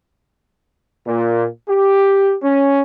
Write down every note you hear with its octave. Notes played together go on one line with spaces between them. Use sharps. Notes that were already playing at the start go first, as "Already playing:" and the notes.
A#2
G4
C#4